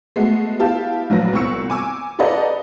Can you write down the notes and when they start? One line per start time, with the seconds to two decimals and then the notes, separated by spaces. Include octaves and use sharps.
0.16 G#3 A3 B3 F#4
0.59 B3 E4 G4 F5 A5
1.10 A#1 F#3 B4 A#6
1.33 C2 B3 C4 C#6 E6 C#7
1.70 G#5 D6 E6
2.19 G4 A4 B4 D5 D#5 A#5